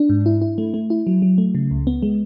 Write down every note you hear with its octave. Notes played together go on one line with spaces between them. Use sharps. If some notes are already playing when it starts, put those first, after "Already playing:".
Already playing: D4
G#2
E4
E4
A3
A3
E4
F#3
F#3
A3
C#3
C#2
B3
G#3